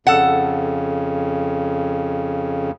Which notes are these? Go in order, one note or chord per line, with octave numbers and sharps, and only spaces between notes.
F2 C#3 A4 F#5